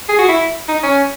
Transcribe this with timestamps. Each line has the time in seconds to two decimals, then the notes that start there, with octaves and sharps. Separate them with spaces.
0.09 G#4
0.19 F#4
0.28 E4
0.68 D#4
0.83 C#4